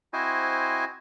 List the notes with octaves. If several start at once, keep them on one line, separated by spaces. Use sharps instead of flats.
C4 E4 F#4 C5 D#5 G#5